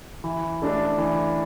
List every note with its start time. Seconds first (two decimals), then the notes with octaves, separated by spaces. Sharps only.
0.24 E3
0.62 A3 D4 A4
0.98 E3